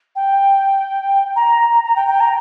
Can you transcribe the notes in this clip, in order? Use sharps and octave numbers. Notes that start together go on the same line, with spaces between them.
G5
A#5
A#5
G5
G5
A#5